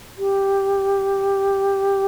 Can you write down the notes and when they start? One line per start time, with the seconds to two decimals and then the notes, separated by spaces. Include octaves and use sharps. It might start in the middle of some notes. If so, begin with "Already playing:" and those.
0.18 G4